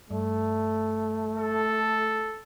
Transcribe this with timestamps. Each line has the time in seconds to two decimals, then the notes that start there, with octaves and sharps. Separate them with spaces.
0.11 G2 A3
1.38 A4